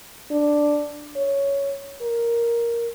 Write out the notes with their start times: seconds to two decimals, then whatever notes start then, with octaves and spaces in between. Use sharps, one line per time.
0.31 D4
1.16 C#5
2.01 A#4